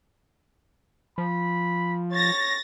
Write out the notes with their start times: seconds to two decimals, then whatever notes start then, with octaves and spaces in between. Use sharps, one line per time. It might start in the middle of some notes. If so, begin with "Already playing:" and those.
1.18 F3 B5
2.11 C#5 A6 A#6